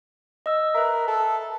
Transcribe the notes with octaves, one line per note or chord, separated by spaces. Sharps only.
D#5 E6
A#4 B4 E5
A4